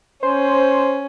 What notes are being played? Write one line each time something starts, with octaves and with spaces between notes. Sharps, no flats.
C#4 C5